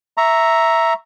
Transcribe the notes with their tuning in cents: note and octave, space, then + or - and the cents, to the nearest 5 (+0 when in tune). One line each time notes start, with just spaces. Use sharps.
E5 +0 A#5 +0 C#6 +0